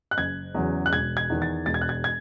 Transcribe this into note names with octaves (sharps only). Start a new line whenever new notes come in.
F#6
F#1 G#6
E2 C#3 F#3
F#6
E1 G#6
G#6
E2 D#3
A6
E1 A6
G#6
F#6
G#6
G#6